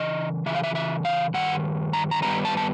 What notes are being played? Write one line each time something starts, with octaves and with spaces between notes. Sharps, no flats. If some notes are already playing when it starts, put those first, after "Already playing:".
Already playing: C#3 E3 D#5
C#3 E3 E5
F5
E5
E5
F5
G2 D#3 F#5
A#5
A#5
G2 D#3 G3 B3 D#4 A#5
A5
A5